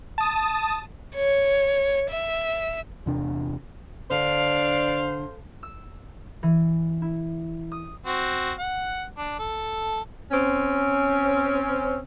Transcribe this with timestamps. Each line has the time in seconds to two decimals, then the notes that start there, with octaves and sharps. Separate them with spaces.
0.18 A5 D#6
1.15 C#5
2.10 E5
3.06 E2 C3 D4
4.11 D3 D4 C5 F5
5.63 E6
6.43 E3
7.02 E4
7.72 D#6
8.06 C4 F#4
8.59 F#5
9.18 D4
9.39 A4
10.32 C4 C#4